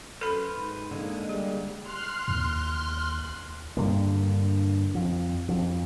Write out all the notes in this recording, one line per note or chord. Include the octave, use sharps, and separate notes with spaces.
F#2 A4 B4 C5 B5
G#2
D3 G#3 A#3
G3 G#4
C6 F6 F#6
D#2
G2 D3 A#3
F2
F2